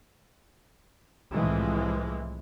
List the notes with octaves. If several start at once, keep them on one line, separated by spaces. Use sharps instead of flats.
C2 A2 E3 F3 G#3